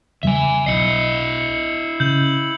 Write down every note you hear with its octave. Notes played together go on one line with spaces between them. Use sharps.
E2 C#3 G3 E5 G#5
B1 E4 D#5 C7 C#7
C#3 G6 F#7